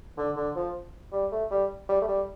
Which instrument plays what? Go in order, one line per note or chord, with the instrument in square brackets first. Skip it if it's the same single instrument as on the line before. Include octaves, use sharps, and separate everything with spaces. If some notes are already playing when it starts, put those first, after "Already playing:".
[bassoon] D3
D3
F3
G3
A3
G3
G3
A3
G3